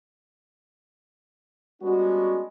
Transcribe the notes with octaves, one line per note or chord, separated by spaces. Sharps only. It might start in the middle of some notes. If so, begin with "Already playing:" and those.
G3 G#3 B3 C#4 D4 F#4